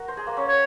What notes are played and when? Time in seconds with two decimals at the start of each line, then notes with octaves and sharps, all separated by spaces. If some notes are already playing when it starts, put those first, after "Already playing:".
Already playing: F#4 A#4
0.08 C5
0.17 G#4
0.27 A#3
0.37 C#4
0.46 C#5